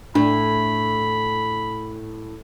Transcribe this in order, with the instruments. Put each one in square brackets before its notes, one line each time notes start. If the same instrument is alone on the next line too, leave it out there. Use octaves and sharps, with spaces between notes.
[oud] A2 [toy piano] D4 [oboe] B5